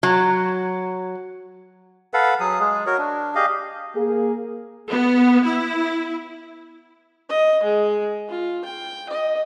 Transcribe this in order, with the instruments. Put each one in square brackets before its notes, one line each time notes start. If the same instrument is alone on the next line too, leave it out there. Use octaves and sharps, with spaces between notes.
[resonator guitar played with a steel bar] F#3
[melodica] A4 B4 F5 F#5
F#3 G#4 D#6
G#3 G#4
F#4 A#4 C#5
D4
G4 G#4 D#5 F5
[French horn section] A#3 G#4
[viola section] B3
E4
[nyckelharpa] D#5
G#3
F4
G5
D#5